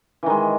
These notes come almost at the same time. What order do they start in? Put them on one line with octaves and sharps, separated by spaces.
E3 D#3 G#3